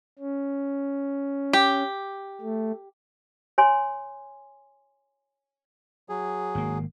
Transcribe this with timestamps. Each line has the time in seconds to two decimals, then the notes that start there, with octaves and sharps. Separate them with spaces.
0.18 C#4
1.53 G4
2.41 A3
3.58 C#5 G#5 C6
6.09 F#3 G#4
6.55 G#1 A#3